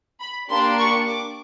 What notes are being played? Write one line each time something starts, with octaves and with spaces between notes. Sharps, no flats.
B5
A#3 D4 G4 C6
C#6
D6